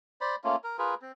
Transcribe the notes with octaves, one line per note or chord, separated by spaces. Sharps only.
C5 D5 B5
A3 A#3 C#4 F4
A#4
F4 G#4 A#4 B4
C4